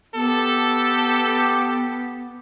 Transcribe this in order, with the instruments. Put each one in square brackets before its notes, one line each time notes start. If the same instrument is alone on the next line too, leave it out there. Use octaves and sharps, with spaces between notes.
[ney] B3 [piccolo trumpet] G4 [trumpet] A4